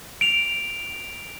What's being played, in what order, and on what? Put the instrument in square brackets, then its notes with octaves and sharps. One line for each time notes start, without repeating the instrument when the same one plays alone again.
[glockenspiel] D7 F7